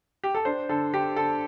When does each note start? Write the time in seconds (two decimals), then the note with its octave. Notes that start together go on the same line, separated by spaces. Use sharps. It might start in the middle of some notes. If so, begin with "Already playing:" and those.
0.24 G4
0.35 A4
0.45 D4 C5
0.69 D3 A4
0.93 D3 G4
1.16 D3 A4